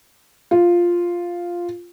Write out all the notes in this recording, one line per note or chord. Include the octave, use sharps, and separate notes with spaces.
F4